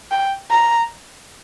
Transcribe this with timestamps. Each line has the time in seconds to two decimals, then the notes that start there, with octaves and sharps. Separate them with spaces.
0.11 G5
0.50 A#5